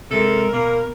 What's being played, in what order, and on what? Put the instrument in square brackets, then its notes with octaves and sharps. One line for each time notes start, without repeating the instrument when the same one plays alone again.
[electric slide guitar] C3 G#3 [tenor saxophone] A4 [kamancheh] A#4
[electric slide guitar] B2 [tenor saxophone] A#3